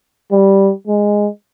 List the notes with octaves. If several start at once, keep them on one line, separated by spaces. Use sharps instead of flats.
G3
G#3